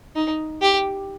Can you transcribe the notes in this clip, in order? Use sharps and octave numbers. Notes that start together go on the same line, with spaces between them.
D#4
G4